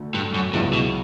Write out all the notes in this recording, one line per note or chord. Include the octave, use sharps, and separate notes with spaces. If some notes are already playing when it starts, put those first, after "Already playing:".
Already playing: D2 D3 A3
G2
F#2
C#2 G2 C#3 F#3 B3 E4
B2